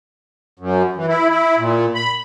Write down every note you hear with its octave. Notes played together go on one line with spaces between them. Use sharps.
F#2
E3
E4
E4
A#2
B5